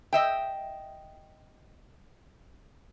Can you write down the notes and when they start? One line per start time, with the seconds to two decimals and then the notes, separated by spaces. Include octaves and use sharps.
0.13 D#5 E5 G5